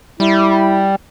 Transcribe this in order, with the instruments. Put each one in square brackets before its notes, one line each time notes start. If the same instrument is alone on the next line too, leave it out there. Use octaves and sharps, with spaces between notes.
[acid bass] G3 [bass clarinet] E4